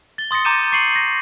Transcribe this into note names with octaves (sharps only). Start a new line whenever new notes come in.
A6 G7
C6 D#6 A6 A#6 C#7
A#5 D6 G6 C#7 D#7 E7
C#6 C7 C#7 D#7 F#7
A#6